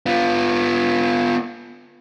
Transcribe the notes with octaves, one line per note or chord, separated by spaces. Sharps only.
B3 F4